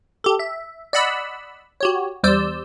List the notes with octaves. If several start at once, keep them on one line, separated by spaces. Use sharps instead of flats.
G4 A4
E5
D5 D#5 F#5 B5 E6
F#4 G4 C#5
E2 G3 C5 D5 E6 G6